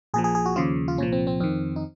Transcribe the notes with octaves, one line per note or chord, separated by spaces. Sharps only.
A#1 A#2 F3 G#4
G#4
G#4
F#4
D#2 C#3 F3 F4
F4
C2 A#2 F3 C#4
C4
C4
F2 D#3 C4
D#4